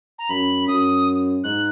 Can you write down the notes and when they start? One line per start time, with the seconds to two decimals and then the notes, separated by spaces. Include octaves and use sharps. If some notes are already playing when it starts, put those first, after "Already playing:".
0.19 A#5
0.29 F#2 B5
0.67 F#2 D#6
1.44 G#2 F#6